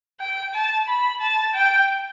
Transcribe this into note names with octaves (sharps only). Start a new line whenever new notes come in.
G5
A5
B5
A5
G5